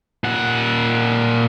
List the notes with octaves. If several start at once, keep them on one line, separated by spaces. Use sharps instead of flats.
A#2 F#5